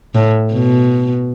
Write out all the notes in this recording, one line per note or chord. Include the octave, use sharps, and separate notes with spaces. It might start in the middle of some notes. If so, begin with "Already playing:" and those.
A2
B2